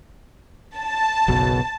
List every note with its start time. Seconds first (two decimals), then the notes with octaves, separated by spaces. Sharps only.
0.77 A5
1.28 F#1 B1 B2